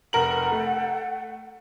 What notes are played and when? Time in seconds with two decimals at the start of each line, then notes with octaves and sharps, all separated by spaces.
0.13 F1 A4 A#4 F#5 G5 F#7
0.52 A3